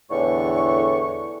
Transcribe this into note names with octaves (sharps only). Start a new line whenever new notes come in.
E2 A2 D3 C#6